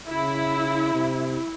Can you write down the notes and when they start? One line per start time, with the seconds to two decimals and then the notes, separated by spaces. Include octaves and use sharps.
0.08 C#3 E4
0.93 C3